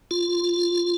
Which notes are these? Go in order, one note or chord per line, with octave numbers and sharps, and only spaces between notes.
F4